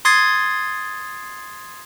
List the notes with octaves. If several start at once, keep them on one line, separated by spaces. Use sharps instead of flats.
C6 D#6 G#6 A6 C7